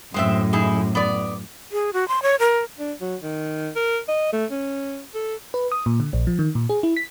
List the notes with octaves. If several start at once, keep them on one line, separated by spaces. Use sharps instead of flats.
F#2 A2 G#3 C4 E5
D#4 E4 G#4
B3 D5
G#4
F#4
C6
C#5
A#4
D4
F#3
D#3
A#4
D#5
A3
C#4
A4
B4
D#6
A#2
D3
A#1
F3
D#3
A#2
G#4
E4
B6